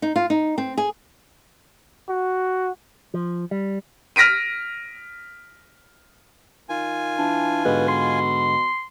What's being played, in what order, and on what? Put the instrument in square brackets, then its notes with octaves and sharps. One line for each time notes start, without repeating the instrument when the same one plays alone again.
[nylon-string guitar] D#4
F4
D#4
C4
G#4
[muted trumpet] F#4
[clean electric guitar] F3
G3
[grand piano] F6 A#6 B6 D7 D#7
[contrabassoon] D#3 [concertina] F4 G#5
[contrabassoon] E3 [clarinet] D4
[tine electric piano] G#2 D3 G#3 [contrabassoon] B2 [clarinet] B4
[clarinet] C6